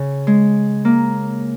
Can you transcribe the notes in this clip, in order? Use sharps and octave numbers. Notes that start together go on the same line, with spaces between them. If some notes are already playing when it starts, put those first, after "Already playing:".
Already playing: C#3
G#3
A#3